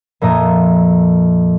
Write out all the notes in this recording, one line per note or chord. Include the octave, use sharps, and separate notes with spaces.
F2 A#2 E5 A#5 D#6 G#6